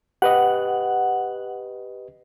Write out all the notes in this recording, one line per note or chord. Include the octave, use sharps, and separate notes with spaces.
G4 B4 D#5 F#5